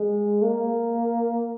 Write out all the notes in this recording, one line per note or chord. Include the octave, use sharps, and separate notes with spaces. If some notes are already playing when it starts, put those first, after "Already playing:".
Already playing: G#3
A#3